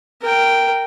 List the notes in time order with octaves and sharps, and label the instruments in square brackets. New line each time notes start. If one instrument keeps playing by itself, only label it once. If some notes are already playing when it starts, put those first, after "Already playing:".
[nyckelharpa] A#4 G5